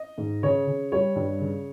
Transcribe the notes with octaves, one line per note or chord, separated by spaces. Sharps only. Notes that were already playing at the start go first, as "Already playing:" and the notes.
Already playing: D#5
G#2
C#3 C#5
C#3
G3 C#5
G2
C#3